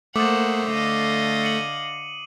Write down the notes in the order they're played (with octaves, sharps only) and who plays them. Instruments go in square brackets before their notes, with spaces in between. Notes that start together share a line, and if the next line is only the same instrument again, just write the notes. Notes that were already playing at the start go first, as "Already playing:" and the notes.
[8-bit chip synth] A3 [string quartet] A#3 C5 F#5 [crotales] D6 D#6
[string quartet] D3 D#5 F5 [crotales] C7
[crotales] C#7 D#7 F#7